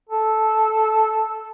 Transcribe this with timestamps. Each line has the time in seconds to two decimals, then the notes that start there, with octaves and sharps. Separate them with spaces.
0.10 A4